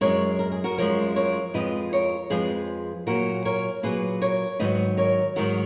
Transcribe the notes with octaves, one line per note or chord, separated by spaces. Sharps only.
F#2 F3 G#3 A#4 C#5
A#4
G#4
F#4 A#4
F#2 F3 G#3 A#4 C#5
A#4 C#5
F2 F3 G#3 B4 D#5
A#4 C#5
F2 F3 G#3 G#4 B4
A#2 F#3 F#4 A#4
A#4 C#5
A#2 F#3 G#4 B4
A#4 C#5
G#2 D#3 F#3 B4 D#5
A#4 C#5
G#2 D#3 F#3 F#4 A#4